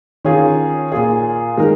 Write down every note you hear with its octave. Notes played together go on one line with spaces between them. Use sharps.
D#3 C#4 F4 G#4
A#2 A#3 F4 G#4
D#3 G#3 D#4 A#4